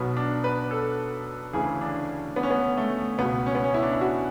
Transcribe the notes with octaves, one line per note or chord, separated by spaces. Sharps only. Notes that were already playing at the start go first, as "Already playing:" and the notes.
Already playing: B1 B2 B3
D4
B4
A4
D2 C#3 E3 G#4
D4
B3
C#4
B3
A3
C#2 B2 B3
C#4
B3
C#4
E4
D4
E4
F#4